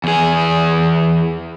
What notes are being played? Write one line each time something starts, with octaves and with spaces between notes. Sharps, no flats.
E2 G#4